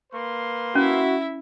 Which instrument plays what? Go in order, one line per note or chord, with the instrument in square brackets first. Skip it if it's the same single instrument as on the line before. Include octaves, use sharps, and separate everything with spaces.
[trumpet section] A#3 B4 C6
[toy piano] C#4 [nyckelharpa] E4 E5 [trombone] F#4